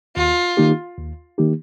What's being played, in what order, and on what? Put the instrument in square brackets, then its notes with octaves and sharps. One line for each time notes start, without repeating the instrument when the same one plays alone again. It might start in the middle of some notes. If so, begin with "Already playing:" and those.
[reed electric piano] D#2 [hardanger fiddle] F4
[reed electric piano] D#3 A#3 D#4 G4
D#2
D#3 A#3 D#4 G4